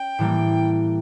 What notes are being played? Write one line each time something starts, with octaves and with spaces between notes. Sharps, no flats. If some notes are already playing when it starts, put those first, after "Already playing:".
Already playing: C#4 G5
A2 E3 G3 A#3